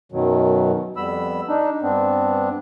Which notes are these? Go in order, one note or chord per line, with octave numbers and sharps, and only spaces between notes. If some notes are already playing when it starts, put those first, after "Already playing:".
F#2 B2 D#3 F#3
F2 G3 B3 B5 E6
D4 D#4
G2 B3 C4 D4